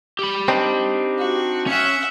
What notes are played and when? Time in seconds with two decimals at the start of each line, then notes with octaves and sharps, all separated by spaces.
0.19 G4 B5
0.48 C4 D4 D#4
1.18 F#4
1.67 C#4 E5 F#5